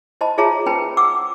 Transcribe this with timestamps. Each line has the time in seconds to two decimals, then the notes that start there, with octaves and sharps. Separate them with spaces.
0.21 C5 D#5 A5 B5
0.38 F4 G#4 C#5 E5 A5 A#5
0.66 C#4 B4 C5 G5 A5 B5
0.97 F#5 D6 E6